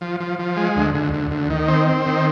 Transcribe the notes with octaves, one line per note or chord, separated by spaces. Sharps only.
F3
F3
F3
G#3
D2
D2
D2
D2
D#3
C4
C4
D#3